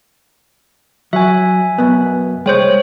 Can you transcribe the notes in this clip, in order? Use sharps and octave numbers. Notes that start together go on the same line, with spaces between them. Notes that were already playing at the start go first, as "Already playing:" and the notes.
F#3 E5 G#5
F#2 B2 B3
C2 G#3 C5 C#5 G5